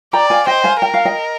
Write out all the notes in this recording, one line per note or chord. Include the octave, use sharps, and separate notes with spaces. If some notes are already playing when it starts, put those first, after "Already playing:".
D5 G5 A#5
F5 G#5
C5 D#5 G5
F5 G#5
A#4 G5
F5
D#5 G5